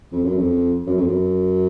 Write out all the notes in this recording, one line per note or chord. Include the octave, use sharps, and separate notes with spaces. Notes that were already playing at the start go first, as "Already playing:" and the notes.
F2
F#2
F2
F#2
F2
F#2